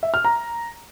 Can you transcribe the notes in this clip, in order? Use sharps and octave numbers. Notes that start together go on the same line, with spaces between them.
E5
F6
A#5